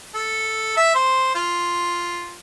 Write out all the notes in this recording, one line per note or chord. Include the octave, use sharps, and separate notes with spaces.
A4
E5
C5
F4